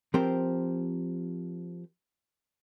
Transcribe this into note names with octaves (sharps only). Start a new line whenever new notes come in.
F3 C4 G4 A#4 C5